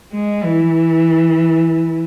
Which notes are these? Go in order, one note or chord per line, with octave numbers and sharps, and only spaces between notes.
G#3
E3